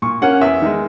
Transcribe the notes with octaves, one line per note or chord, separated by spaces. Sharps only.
A#2 C#6
A#3 C#4 F#5
E2 E5
D#3 G#3